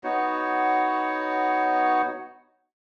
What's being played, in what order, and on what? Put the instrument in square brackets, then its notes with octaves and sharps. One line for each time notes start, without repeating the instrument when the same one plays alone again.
[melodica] B3 D#4 F#4 C#5